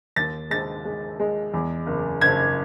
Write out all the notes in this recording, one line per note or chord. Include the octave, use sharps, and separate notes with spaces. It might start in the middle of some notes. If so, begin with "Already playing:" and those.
D#2 A6
G#3 A6
G#3
G#3
E2
F#1
F#1 G#6